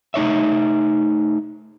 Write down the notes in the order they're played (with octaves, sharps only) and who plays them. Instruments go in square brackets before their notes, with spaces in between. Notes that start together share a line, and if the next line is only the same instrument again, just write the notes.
[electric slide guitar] A3 D#4 C#5 E5